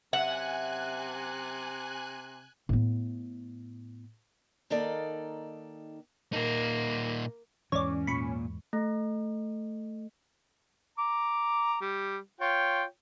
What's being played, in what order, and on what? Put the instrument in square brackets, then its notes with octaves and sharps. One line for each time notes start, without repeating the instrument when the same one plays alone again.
[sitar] F#2 E5 [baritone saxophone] C3 [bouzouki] F#5 [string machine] G#5 F#6
[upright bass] A2 B3
[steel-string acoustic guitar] D#3 A#3 D#4 A4 D5
[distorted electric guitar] A#2 D#4 [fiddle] A#3
[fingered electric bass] E2 G#2 [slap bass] E3 [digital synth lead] C#4 [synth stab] C#5 D5
[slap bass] A#2 A#3 [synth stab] B5 C#6
[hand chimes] A3
[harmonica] A#5 D6
G3
F4 C#5 G5